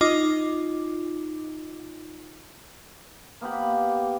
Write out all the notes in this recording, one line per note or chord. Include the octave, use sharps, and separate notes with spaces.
D#4 F4 D#5 D6
A#3 B3 G4 B5